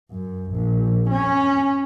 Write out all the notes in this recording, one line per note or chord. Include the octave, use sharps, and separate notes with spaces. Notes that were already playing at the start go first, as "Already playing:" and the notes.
F#2
A#1
C#4